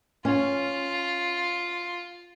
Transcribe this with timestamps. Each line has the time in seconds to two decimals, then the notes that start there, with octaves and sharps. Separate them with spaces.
0.25 C#4 F4